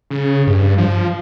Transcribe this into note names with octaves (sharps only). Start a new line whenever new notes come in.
C#3
G2
F3